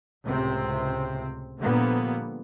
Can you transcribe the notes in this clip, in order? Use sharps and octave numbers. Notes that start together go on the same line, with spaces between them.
C#2 A2 C3 C4
A#2 D3 F3 G3 A#3 B3